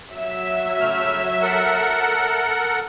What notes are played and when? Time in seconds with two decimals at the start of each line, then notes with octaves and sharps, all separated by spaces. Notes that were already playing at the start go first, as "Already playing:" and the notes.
0.12 F#3 E5
0.80 C#3 A3 F6
1.42 A4 A#4 F#5